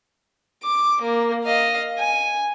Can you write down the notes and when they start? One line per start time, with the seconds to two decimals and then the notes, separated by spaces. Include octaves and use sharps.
0.63 D6
1.01 A#3
1.44 D#5 F5
1.98 G#5